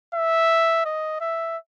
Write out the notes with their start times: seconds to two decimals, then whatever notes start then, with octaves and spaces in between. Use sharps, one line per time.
0.15 E5
0.85 D#5
1.21 E5